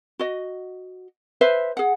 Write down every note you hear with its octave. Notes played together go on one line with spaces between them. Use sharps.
F#4 D#5
B4 C5 E5
G#4 F#5